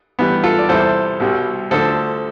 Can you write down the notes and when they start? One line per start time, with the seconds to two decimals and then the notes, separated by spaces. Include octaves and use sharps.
0.19 A1 G2 E3 G3 B3
0.43 F4 A4
0.58 D5
0.69 E2 C3 E3 G3 A4 C5
1.20 C2 B2 G3
1.71 D2 D3 F3 A4 C5